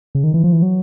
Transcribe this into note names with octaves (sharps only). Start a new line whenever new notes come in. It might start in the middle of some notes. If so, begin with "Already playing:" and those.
C#3
D#3
E3
F3
E3
F#3